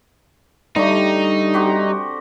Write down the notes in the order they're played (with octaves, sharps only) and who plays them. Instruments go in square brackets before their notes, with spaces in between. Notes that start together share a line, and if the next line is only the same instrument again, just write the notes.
[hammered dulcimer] D3 A3 [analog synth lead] G3 [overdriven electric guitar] D#4
[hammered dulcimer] C4 F#4 G4